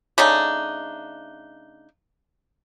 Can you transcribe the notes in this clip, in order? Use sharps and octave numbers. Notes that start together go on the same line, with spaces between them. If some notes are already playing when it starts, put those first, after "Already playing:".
C#3 A3 D4 D#4